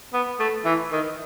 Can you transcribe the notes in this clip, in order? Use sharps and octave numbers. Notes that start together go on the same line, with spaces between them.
B3
A3
E3
D#3